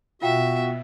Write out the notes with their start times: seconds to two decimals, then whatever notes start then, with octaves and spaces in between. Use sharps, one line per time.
0.22 B2 F4 F#4 E5 F5 G5